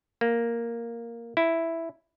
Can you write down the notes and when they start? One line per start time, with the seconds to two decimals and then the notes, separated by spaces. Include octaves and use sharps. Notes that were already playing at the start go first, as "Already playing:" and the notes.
0.21 A#3
1.37 E4